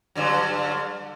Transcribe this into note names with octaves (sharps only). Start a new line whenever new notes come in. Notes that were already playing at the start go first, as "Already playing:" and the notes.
G2 D3 F#3